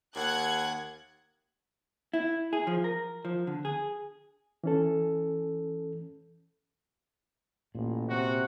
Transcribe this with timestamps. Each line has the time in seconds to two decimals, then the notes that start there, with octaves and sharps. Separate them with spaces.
0.15 D#2 F#5 F#6 G#6
2.13 E4
2.53 G#4
2.67 F3
2.84 A#4
3.25 F3
3.47 D3
3.65 G#4
4.64 E3 C#4 A4
7.75 A1 A#2
8.09 C3 F#4